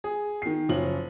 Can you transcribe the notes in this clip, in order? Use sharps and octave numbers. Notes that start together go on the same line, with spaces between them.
G#4
D#3 C7
F#1 F3 C#4 F#7